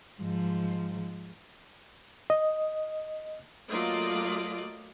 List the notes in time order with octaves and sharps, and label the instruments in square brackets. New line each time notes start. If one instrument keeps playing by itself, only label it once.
[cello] G#2 F3
[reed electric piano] D#5
[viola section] F#3 A3 A#3 F4 D5 D#5